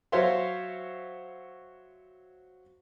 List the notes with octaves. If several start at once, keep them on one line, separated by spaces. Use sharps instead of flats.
F#3 C5 C#5 E5 F5 C6